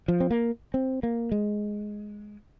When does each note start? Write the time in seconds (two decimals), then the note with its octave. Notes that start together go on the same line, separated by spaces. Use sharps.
0.08 F3
0.20 C4
0.31 A#3
0.74 C4
1.03 A#3
1.32 G#3